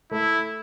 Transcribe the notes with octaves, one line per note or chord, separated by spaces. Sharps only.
A3 E4